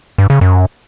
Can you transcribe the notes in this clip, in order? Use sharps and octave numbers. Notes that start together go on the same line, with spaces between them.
G2
C#3
F#2